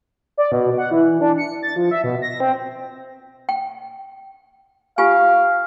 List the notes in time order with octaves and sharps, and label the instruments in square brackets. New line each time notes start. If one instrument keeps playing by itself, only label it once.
[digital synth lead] D5
B2
F#5
E3
D4
C#7
A6
F3
E5
B2
A#6
C4
[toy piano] G5
[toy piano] F4 G4 G#5 [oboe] F5